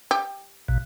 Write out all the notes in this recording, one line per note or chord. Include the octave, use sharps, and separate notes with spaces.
G4
A#1 B2